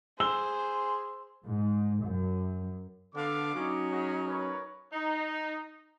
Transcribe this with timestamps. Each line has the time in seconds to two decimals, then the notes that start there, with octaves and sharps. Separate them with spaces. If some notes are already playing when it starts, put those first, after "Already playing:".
0.20 G#4 C5 E6 G7
1.44 G#2
2.03 F#2
3.15 D3 B3 D4 A4 F5 D6
3.55 F#3 C#4 D#4
3.92 F#4 G#4 C#5
4.27 A#4 B4 C#5
4.92 D#4